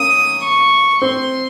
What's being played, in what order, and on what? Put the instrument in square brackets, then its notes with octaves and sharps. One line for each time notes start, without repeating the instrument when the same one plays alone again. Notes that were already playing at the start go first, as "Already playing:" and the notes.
Already playing: [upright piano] A#3 C#4 [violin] D#6
[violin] C#6
[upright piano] C4 [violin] C6